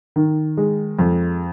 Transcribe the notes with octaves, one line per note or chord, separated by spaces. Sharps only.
D#3
G#3
F2